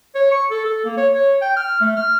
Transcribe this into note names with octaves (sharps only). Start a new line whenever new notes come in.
C#5
C#6
A4
A4
A#3
C#5
C#5
G5
F6
A3
F6